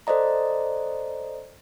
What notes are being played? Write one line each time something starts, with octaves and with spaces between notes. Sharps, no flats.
A4 C5 D5 D#5 A#5